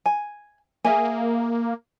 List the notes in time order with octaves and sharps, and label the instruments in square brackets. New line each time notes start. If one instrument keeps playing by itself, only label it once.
[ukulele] G#5
[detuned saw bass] A#3 [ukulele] G#4 E5 G#5